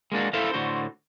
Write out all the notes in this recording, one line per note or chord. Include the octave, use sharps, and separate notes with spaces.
G#3 A#3 D4 F#4
E4 A4 B4 C5 E5 F5
A2 D3 F#4 C5 C6